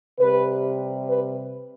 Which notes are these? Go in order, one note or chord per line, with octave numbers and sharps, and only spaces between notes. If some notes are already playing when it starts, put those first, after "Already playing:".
C3 G3 B4
B4